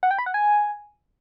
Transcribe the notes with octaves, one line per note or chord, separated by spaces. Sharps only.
F#5
G5
B5
F#5
G#5